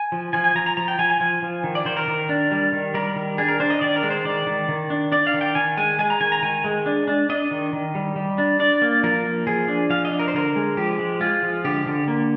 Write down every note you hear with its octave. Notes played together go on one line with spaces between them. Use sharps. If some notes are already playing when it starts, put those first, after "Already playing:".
Already playing: G#5
F3
F3 G#5
G#5
F3 A#5
A#5
F3 A#5
G5
F3 G#5
G#5
F3
F3
D#3
D5
D#3 C5
A#4
D#3
D4
G3
D#3
G3 A#4
D#3
D4 G#4
A#4
D4 C5
D#5
D#3 D5
A#4
G#3
C5
D#3 D5
D#3
D#3
D4
D4 D5
F5
D#3
G5
D#3 G#5
G#3 G#5
G#3 G#5
A#5
D#3 G#5
A#5
D#3 G#5
G#3
D4
D4
D4 D#5
D#3
D#3
G3
G3
D4
D4 D5
A#3
F3 A#4
A#3
F3 G#4
D4
F3 F5
D#5
D4
A#4
C5
D3 A#4
G#3
F3 G4
G#3
G#3 F4
F3
D3 G4
D3
A#3